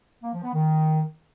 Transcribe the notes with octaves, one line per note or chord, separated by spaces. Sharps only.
A#3
F3
B3
D#3